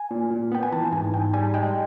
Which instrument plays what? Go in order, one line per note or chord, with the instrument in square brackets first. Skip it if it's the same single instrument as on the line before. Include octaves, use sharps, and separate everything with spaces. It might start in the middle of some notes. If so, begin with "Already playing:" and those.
Already playing: [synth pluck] G#5
[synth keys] A#2
A#2
[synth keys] B3 [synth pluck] G5
[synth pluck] G#5
[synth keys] E3 [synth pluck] A5
[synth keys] G#2 [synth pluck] G#5
[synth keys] G#2 [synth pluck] G5
[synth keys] G3 [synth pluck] G#5
[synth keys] G#3 [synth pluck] G5